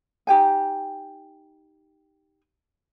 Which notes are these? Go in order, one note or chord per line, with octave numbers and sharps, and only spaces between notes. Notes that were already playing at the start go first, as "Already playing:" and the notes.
D#4 G4 G5 G#5